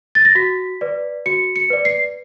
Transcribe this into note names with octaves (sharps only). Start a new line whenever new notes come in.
A6
A#6
F#4 B6
B4 D5
F#4 C#7
C#7
B4 D5
C7